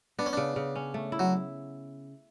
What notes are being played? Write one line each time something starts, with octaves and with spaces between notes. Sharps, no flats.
B3 D4
C#4
C#3 D4
C#3
C#4
A3
E4
F#3